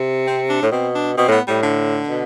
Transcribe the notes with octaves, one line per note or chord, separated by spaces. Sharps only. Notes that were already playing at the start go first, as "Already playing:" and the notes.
Already playing: C3
C4
D4
A2
B2 C4
D4
B2 C4
A2 B3
A2 G3
D3
B2